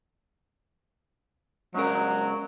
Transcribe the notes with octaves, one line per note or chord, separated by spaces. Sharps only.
G#2 C#3 F#3 A#4